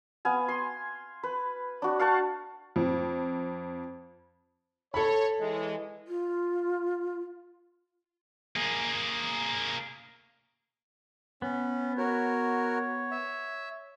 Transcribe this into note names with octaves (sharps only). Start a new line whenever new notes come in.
B3 F5 G#5
C6
B4
D4 F#4
F5 F#5 A5 C#6
F2
A4 C#5 B5
E3 G#3
F4
A#3 G#4
B3 C#4
F#4 A#4 C#5
E5